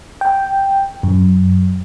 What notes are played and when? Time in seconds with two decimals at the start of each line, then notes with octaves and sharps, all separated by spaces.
0.21 G5
1.03 F#2